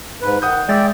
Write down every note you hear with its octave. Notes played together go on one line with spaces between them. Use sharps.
G#2 B4
D#3 F#5 D#6 G6
G#3 D5 E5 G5 A6